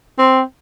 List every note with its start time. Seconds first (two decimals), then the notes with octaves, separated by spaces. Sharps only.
0.19 C4